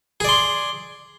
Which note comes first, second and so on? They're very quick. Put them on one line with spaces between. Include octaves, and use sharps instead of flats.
G#4 D5 C6